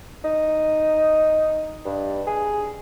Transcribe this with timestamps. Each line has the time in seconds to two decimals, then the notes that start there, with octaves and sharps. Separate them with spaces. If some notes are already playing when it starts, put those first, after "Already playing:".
0.24 D#4
1.85 G2
2.27 G#4